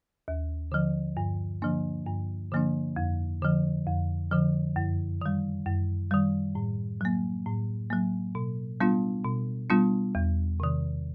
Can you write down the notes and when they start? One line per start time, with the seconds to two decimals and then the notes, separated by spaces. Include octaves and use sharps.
0.28 D#2
0.72 D3 F3
1.17 G2
1.62 D3 F3 A#3 D4
2.06 G2
2.52 D3 F3 A#3 D4
2.96 F2
3.42 D3 F3
3.87 F2
4.31 D3 F3
4.76 F#2
5.21 D#3 G3
5.66 F#2
6.11 D#3 G3
6.55 A2
7.01 F#3 A#3
7.46 A2
7.90 F#3 A#3
8.35 B2
8.80 G3 B3 D4 F4
9.25 B2
9.70 G3 B3 D4 F4
10.15 E2
10.60 C3 D#3